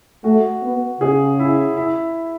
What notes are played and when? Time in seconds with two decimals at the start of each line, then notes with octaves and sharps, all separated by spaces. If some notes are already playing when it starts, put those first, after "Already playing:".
0.24 A3 F#4
0.62 B3
1.01 C#3 G#4
1.39 E4
1.77 E4